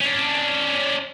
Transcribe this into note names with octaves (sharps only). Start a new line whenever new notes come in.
C#4 D4